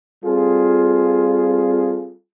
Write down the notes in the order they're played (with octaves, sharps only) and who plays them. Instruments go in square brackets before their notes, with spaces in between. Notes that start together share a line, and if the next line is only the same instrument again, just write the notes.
[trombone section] G3 C4 F4 G#4 A4